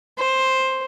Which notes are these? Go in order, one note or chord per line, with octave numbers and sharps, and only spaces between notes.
C5